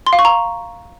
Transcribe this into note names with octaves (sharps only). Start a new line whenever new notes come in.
C6
F5
C#6
A#5